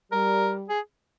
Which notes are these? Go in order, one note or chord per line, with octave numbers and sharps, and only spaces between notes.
G3 A#4
G#4